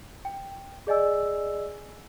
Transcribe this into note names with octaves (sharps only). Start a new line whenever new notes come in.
G5
G#4 D5 D#5 G#5 E6